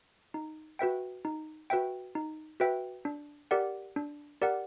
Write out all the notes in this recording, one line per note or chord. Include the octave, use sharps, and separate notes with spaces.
D#4
F#4 B4 E5 G5
D#4
F#4 B4 E5 G5
D#4
F#4 B4 E5 G5
D4
G4 A#4 D5 F#5
D4
G4 A#4 D5 F#5